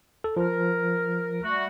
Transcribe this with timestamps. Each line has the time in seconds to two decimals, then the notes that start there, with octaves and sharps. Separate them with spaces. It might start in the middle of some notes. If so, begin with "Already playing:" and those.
0.24 A4
0.37 F3 A#4
1.44 G3 A3 F#4